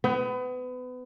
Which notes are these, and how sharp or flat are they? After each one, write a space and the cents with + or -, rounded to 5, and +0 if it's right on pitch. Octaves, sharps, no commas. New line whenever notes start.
B3 +30